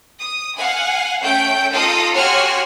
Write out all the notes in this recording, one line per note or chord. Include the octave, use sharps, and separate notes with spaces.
D#6
F5 F#5 G#5
A3 C#4 G5 G6 D7
D#4 F4 A4 F5 A#5 D#6
F#4 G4 C#5 G#5 C6 F6